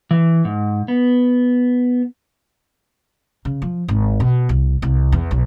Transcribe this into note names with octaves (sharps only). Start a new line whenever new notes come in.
E3
G#2
B3
C#3
F3
G#1
B2
C2
C2
E2
B1